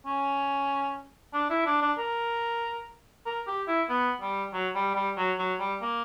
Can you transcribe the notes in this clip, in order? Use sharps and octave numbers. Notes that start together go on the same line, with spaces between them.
C#4
D4
E4
D4
D4
A#4
A#4
G4
E4
B3
G3
F#3
G3
G3
F#3
F#3
G3
A#3